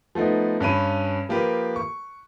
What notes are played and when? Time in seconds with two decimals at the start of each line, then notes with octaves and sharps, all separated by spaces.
0.15 F3 A3 B3 D#4
0.61 G2 C#4 B5 D#7
1.29 F3 A#3 G4 B4
1.76 C#6